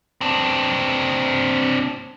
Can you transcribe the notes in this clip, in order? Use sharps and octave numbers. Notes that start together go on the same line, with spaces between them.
C4 D4